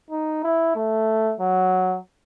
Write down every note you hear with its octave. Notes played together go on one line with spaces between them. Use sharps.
D#4
E4
A3
F#3